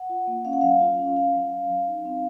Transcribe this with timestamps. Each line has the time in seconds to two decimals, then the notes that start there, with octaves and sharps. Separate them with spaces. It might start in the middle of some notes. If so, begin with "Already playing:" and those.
Already playing: F#5
0.09 F4
0.27 A#3
0.45 C#4 F5
0.53 F#5
0.61 F#3 F5
0.81 F4
0.99 C#4
1.16 C#4 F5
1.34 F#3
1.52 C#4
1.70 F#3
1.87 D#4
2.05 C4